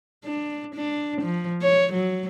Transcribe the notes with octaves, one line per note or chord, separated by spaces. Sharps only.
D4
D4
F3
C#5
F#3